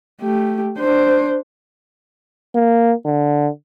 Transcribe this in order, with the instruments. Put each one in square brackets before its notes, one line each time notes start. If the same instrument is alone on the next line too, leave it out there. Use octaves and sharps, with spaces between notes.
[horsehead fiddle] A3 G4
D4 C5
[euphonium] A#3
D3